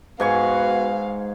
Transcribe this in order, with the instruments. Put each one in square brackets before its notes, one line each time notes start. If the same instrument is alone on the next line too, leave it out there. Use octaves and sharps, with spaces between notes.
[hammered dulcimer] G#2 G#5 C#6 [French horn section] B3 F#4 B4 [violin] F5